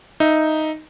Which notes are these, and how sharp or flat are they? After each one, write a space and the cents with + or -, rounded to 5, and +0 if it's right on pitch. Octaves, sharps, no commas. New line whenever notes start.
D#4 +0 E5 +0